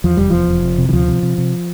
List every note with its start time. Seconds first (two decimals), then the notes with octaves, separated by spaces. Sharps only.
0.04 E2 F3
0.17 F1 G3
0.30 E2 F3
0.48 F1
0.63 C3
0.78 C3
0.89 E3
0.93 D2 F3
1.08 C3
1.23 C3
1.38 C3